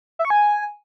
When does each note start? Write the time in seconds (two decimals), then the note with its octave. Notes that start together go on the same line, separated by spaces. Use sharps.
0.19 E5
0.25 C#6
0.30 G#5